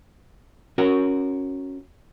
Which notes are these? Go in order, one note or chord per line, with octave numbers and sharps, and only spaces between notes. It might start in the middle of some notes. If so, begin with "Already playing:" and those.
C#4 F#4 A#4